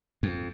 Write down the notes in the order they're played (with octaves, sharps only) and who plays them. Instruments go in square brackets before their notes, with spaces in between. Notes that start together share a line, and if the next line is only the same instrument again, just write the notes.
[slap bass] F2